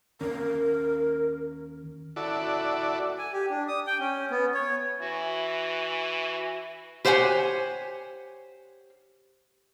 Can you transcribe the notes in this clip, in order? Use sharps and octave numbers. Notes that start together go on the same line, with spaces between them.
D#2 C#4 A#4
E4 F#4 A4 D5
G#5
G4
D4
D#6
G5
C#4
B3
C#5
E3 F#4
G4 C5 C#5 F#5 G#5